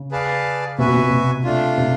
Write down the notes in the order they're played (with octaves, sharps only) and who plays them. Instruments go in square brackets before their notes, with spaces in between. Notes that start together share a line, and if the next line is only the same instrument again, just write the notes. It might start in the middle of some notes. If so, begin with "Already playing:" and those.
Already playing: [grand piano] C#3
[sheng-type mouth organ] G#4 B4 D5 F5 A5
[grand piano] C3 [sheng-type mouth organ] F#4 B4 E5 G#5
[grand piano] B2
C3
B2
C3
[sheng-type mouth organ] A3 D4 F4
[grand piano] C3